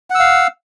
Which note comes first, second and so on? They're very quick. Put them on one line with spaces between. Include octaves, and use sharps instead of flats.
F#5 E6 F5